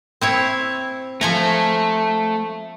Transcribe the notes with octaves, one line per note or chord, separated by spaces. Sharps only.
C4 E4 C#5
F3 A3 G#5 A#5